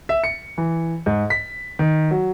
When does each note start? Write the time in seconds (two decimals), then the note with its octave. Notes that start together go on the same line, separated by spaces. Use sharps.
0.09 E5
0.24 C#7
0.58 E3
1.06 G#2
1.30 B6
1.79 D#3
2.11 F#3